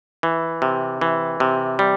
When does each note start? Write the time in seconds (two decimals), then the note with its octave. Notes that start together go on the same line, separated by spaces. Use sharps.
0.23 E3
0.62 C3
1.01 E3
1.40 C3
1.79 G3